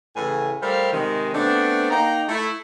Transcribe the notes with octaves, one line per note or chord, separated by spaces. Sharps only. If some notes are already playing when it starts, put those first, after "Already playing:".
A2 C#3 E3 G#5
G3 A3 A#4 C5 E5 F5
C3 D#3 G#3
A3 B3 C4 D4
A#3 D#4 G5 A#5
A3 E4